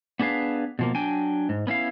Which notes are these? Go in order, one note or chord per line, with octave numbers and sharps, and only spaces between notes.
B3 D4 G#4 B4 F5
B2 F3 A#3
F#3 D4 G5 G#5
G#2
B3 C#4 E4 F5